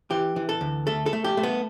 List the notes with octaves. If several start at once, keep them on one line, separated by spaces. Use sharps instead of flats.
E3 G4
E3
A4
D2
A3 A4
A4
A3
G4
A3
B3